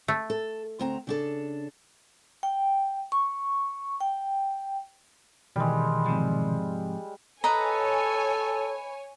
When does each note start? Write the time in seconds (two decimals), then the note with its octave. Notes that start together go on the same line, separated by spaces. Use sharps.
0.08 A3
0.30 A4
0.79 D2 C4 A#5
1.07 C#3 D4 A4
2.43 G5
3.12 C#6
4.00 G5
5.56 B2 D#3 E3 G3 G#3
6.06 G#2 C3 F3
7.44 A4 B4 C#5 D#5 G#5 A#5